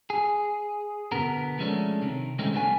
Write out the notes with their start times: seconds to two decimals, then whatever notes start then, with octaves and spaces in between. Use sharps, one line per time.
0.10 G#4
1.12 B2 D3 B3 A#4
1.58 F3 G#3 A3 C#4 D4
2.02 C3 D#3
2.39 D#3 G#3 A3 C4 C#4 D#4
2.52 C2 G3 A3 B3 D4 G#5